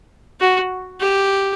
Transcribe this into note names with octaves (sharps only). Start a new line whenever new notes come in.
F#4
G4